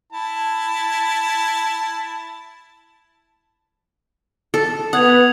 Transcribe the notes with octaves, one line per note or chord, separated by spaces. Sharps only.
E4 A5
A4
B3 F#5 D#6 G#6 F7